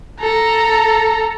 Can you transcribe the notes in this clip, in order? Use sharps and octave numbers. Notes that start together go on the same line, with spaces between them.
A4 A#5